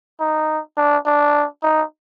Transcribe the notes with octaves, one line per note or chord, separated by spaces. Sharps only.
D#4
D4
D4
D#4